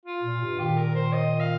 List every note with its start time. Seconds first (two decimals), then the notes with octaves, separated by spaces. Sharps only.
0.05 F4
0.23 A#2
0.40 G2 C3
0.58 A#2 D#3 G4
0.77 A#4
0.95 C5
1.13 D#5
1.40 F5